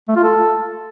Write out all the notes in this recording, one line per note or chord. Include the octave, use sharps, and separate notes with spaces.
A3
F4
A4